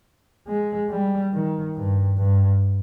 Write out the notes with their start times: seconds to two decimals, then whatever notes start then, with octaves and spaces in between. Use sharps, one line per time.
0.48 G#3
0.90 G3
1.33 D#3
1.75 G2
2.18 G2